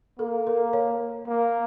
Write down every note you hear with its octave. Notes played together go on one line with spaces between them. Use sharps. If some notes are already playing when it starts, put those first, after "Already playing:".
A#3 A4
A#4
C#5
A#3